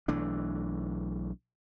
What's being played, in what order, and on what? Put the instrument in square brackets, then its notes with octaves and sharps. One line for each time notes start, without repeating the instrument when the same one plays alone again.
[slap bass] B1 E3 A3 D4